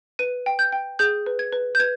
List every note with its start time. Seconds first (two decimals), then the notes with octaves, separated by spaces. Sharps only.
0.19 B4 D#7
0.46 G5
0.59 G6
0.72 G5
0.99 G#4 G6
1.26 B4
1.39 G#6
1.53 B4
1.75 G6
1.79 B4 G#6